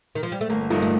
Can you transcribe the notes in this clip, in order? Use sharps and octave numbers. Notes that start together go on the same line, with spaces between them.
D#3
F3
G3
A3
G1 A#3
G2 F3 A3 A#3 D#4
A3